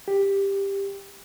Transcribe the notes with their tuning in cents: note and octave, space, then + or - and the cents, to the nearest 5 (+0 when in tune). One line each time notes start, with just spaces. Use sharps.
G4 +10